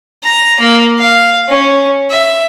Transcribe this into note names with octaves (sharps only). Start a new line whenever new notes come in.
A#5
A#3
F5
C#4
E5